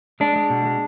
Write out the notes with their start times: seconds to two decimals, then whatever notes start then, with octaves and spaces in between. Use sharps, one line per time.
0.20 G#3 D4
0.36 G#3
0.50 B2
0.66 G#3